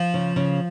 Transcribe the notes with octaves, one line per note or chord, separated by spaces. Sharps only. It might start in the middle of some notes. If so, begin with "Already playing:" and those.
Already playing: F3
C#3
C#3